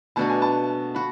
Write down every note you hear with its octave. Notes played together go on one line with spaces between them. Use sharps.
B2 A3 D4 F#4 A5
G#5
A5
F#4 B5